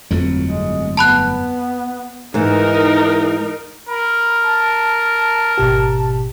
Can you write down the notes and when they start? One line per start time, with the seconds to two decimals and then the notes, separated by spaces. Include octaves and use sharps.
0.11 G1 F2 A2 F#3
0.43 G#3
0.97 B3 A5 B5 F#6
2.34 G#2 E3 D#4 A#4
3.89 A#4 B5
4.43 A5
5.58 G#1 B2 G4